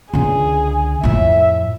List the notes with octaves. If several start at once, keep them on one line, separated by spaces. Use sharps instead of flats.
C#2 D3 G#4
F2 A2 E5